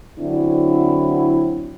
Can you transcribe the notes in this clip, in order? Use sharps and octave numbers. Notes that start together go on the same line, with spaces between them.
D3 F#3 C4 D4 E4